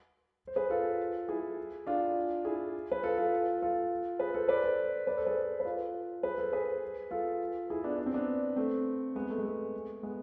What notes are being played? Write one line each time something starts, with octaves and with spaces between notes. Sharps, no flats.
C5
G#4 B4
F4 A4
E4 G#4
D4 F4
E4 G#4
B4
F4 A4
F4 A4
F4 A4
G#4 B4
A4 C5
B4 D5
A4 C5
B4 D5
A4 C5
G#4 B4
B4
F4 A4
G#4 B4
A4 C5
G#4 B4
F4 A4
E4 G#4
B3 D4
D4
C4
B3 D4
A3 C4
G#3 B3
A3
G#3
A3
G#3 B3